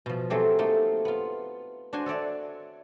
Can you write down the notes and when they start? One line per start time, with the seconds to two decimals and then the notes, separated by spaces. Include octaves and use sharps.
0.06 B2 F3
0.30 F#3 G#3 A3 C4 G4
0.59 A3 A#3 D#4
1.05 B3 F4
1.93 D4 F#4 C5 G#5 C6
2.06 A4 C#5 D5 E5